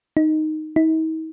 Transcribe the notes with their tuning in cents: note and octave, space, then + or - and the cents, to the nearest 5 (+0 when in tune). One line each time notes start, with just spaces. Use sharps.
D#4 -5
D#4 +45